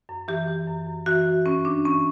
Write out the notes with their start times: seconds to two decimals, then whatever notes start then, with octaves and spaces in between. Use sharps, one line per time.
0.09 F#2
0.28 E3 G4
0.48 E3
0.67 F#2
0.87 F#2
1.06 E3 F#4
1.26 E3
1.46 G2 C#4
1.65 G2 D4
1.85 E3 C#4